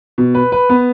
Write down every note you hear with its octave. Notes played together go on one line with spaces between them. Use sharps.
B2
B4
B4
B3